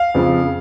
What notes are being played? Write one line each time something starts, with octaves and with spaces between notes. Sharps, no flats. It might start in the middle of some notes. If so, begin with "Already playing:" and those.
Already playing: F5
F2 C#3 F3